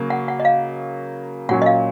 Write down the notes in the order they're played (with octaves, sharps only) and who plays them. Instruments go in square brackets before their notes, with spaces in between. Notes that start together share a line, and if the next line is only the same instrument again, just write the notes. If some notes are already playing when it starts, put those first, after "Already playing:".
Already playing: [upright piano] C#3 F#3 A#3
[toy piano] F#5
F#5
D#5
F5
[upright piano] A#2 F#3 C#4 [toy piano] F#5
[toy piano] D#5
F5